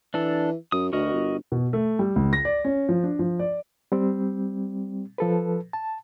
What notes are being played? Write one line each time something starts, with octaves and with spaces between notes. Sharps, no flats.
E3 D4 A4
F#2 D#6
D2 F#4 A#4 D#5
G1
B2
A3
G3
C#2
A#6
D5
C#4
F3
D4
F3
D5
G3 C4
F3 A4 B4
A5